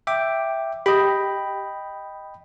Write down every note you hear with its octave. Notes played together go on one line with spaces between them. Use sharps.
E5 G5 D6
G4 D#5 G5 B5